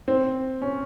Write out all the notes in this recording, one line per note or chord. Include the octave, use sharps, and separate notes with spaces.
C4
C#4